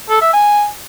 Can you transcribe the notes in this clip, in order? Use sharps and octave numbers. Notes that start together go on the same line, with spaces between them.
A4
E5
G#5